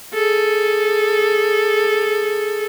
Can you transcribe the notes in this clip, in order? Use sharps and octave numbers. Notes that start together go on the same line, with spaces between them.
G#4 A4